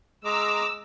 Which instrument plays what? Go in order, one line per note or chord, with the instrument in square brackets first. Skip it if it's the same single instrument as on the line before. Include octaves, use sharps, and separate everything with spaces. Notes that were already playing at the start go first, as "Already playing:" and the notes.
[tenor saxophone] G#3 [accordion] A#5 D6 [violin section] E6